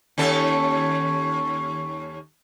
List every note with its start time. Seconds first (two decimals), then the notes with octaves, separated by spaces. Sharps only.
0.18 D#2 C#4 A4